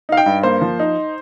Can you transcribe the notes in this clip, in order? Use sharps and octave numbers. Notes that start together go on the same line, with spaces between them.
D#4 F5
G5
G2
A#3 C5
F3
D#4